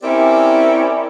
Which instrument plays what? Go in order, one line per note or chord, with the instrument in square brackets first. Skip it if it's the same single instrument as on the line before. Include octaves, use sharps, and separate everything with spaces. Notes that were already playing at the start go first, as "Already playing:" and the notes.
[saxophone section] C4 C#4 E4 G4 A#4 D5